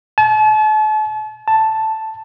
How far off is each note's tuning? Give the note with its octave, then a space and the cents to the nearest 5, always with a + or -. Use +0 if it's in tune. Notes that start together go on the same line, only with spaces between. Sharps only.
A5 -40
A5 +0